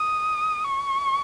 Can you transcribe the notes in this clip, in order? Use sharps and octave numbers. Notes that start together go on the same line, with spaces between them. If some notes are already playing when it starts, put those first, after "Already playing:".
Already playing: D#6
C#6